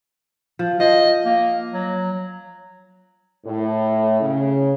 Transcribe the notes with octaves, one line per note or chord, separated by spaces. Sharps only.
F3
F3 D#5
A#3
F#3
A2
C#3